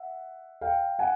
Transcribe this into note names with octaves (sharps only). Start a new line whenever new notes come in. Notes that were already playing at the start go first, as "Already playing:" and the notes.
Already playing: E5 F#5
F5 G5
F#5 G#5